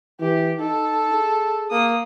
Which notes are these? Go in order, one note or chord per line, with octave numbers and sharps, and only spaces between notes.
E3 G4
D#4 A4
G#4
A#3 D#6